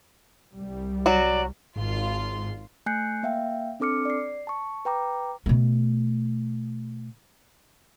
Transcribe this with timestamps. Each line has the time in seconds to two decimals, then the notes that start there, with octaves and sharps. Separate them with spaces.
0.56 C2 G3
1.06 F#3 F#4 D5
1.76 G#1 G#2 F4 C6
2.86 A3 G#5 F#6 G6 C7 C#7
3.23 A#3 E5 F5 G5
3.80 C4 D4 A4 D6 F6 C#7
4.05 D5 C7
4.47 A5 C#6
4.85 B4 G5 A#5 D6
5.46 B2 A3